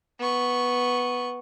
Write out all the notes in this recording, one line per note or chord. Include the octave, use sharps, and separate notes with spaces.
B3 C#6